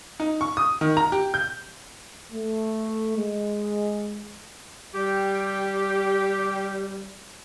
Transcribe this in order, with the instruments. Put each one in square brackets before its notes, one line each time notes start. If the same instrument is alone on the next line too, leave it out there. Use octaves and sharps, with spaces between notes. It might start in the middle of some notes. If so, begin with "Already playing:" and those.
[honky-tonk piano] D#4
C#6
D#6
D#3
A#5
G4
G6
[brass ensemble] A3
G#3
[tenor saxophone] G3 [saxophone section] G4